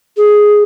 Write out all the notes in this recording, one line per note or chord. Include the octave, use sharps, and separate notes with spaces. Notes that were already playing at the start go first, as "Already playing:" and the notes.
G#4